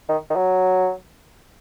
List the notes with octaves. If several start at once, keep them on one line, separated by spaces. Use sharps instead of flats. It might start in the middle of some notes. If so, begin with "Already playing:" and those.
D#3
D#3
F#3